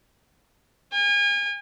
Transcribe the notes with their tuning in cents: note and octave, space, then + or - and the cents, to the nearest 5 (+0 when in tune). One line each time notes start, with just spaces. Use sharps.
G#5 -40